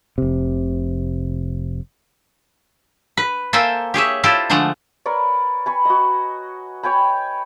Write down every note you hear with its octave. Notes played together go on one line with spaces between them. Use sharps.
F1 C3
B4
A#3 A4 C5 E5 G5 G#5
G4 G#4 C#5 E5
E4 F4 G4 A4 C5 D5
D3 F3 G#3 A3 F#5
A#4 B4 C#5 D5
G#5 B5 C#6
F#4 D#5
C#5 G5 G#5 B5